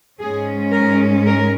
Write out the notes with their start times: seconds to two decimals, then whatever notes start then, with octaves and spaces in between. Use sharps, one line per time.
0.20 G#2 G#3 C#4 G#4
0.73 A#4
1.26 A#4